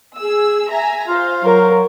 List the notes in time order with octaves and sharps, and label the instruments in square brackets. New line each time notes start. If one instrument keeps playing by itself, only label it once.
[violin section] G#4 E6
E5 G#5 A#5
[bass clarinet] F4 [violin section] C5 F5
[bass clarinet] F#3 [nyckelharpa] A#4